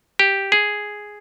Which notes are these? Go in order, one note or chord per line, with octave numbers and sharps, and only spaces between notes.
G4
G#4